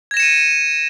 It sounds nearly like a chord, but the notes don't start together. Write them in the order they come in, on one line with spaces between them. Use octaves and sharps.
G#6 A#6 E7 C#7 D#7